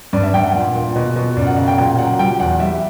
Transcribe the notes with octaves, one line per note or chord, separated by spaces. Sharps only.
G2 D5
E5
G2 G5
F#5
A#2
A#2
B2
B2
F#2 D5
F#5
C#3 F#5
G5
A#2 G5
F#3 F#5
G3 G5
E2 F#5
G3 E5